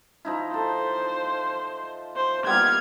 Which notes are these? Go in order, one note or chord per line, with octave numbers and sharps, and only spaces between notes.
F3 D#4 E4
A4 C5
C5
G3 A#3 B3 F6 G#6